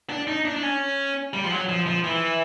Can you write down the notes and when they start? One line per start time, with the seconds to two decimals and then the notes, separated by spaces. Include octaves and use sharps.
0.09 D4
0.27 D#4
0.45 D4
0.57 D4
0.63 C#4
1.34 G3
1.44 F3
1.51 F#3
1.69 F3
1.87 F3
2.04 E3